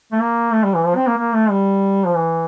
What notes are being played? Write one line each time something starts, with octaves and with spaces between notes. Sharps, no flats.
A3
A#3
A3
G3
E3
F3
C4
A#3
A#3
A3
G3
F3
E3